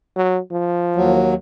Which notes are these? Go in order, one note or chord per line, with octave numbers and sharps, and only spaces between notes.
F#3
F3
D#2 F#3